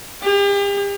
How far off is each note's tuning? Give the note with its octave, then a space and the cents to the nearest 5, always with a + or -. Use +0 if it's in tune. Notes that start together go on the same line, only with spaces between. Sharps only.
G4 +40